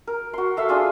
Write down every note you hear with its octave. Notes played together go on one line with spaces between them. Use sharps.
A#4
F#4 C6
A4 E5 F5 C6
D4 F4 G#4